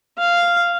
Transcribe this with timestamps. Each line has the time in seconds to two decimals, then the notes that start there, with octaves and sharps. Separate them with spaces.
0.18 F5